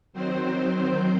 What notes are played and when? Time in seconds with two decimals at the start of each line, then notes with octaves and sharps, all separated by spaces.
0.13 D#3 F#3 C4 C5